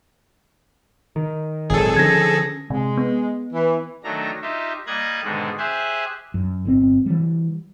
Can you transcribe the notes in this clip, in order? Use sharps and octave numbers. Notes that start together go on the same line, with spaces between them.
D#3
G#1 A#2 F#3 G#4 A4
D3 F3 C#4 G#6 A#6
C3 G#3
B3
E3
D#3 F#3 A3 D4 A#5
D#4 F4 G4 E5
G3 A#3 D#5 A#5 F#6 G#6
G#2 B2 D3 D#3 G#3
G4 G#4 C5 E5 G#5 F#6
F#2
G1 C3 C4
E3 G3